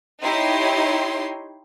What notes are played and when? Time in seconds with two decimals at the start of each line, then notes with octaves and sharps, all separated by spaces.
0.22 D#4 E4 G4 C#5 C6